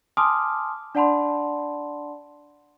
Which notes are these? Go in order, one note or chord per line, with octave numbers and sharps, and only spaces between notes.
G#5 A5 C6 D6 D#6 F6
D4 D5 F#5 A5 B5 C6